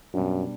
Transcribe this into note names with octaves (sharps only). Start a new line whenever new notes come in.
F#2 B2 G3 D4